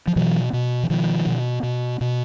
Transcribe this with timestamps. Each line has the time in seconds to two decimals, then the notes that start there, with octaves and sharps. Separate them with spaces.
0.08 F3
0.16 B2 E3 F#3
0.53 B2
0.83 E3
0.90 B2 D#3 F3
1.26 B2
1.63 B2
2.01 B2